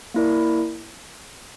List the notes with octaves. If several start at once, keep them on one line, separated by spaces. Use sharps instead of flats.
A#3 E4 A#4 D5